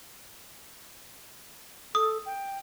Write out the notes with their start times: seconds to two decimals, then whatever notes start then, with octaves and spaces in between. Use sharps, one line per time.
1.95 A4 D#6
2.26 G5